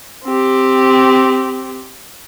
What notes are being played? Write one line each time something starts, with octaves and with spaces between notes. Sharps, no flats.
C4 G4